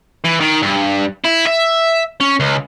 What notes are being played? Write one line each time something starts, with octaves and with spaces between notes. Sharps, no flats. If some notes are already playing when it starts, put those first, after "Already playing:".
E3
D#3
G2
E4
E5
C#4
C#2